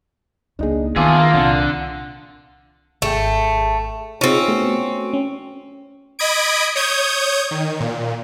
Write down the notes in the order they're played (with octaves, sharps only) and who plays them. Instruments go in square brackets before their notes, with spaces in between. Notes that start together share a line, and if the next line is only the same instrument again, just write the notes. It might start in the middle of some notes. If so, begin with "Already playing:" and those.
[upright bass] C#2 A#3 [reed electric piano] D4 D#4 G#4
[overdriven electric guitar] E2 G#4 [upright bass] D#3 [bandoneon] F4 [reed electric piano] A5 D6 E6
[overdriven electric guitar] A#3
[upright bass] C2 [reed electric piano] A#2 [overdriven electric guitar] D3
[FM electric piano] G#1 G#4 G5 [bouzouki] A3
[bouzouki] C4 C#4 [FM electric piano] D#4 F4 G#4
[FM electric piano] A3 B3 F#4
C#4
[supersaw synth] D#5 B5 D#6 G#6 D7
C#5 D#6 G6 G#6
D#3
A#2